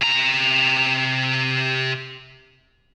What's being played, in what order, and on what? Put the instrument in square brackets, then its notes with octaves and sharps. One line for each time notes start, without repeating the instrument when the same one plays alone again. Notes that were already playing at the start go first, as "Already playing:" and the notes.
[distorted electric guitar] C3 A#5